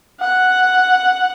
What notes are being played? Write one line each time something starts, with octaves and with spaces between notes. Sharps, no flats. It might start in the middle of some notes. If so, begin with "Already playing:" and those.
F#5